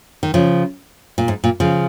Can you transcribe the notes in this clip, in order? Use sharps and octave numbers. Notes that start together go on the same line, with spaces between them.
D#3
C#3 F3
A#2
G#2
A#2
C#3 F3